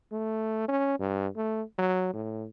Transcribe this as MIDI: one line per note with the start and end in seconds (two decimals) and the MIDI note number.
0.12 0.64 57
0.68 0.95 61
0.99 1.28 43
1.37 1.62 57
1.78 2.10 54
2.14 2.47 45